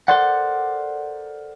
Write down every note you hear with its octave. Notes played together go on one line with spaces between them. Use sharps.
A4 A#4 C5 D5 F#5